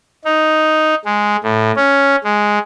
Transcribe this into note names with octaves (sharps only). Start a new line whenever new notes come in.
D#4
G#3
A2
C#4
G#3